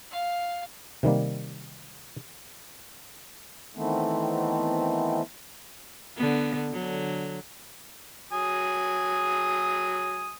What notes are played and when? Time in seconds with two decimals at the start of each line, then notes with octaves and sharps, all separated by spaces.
0.11 F5
1.03 C3 D#3 G3 A#3
3.75 D#3 E3 A3 B3 C4
6.17 D3 B3
6.71 D3 F#3
8.33 F#3 G#5 D#6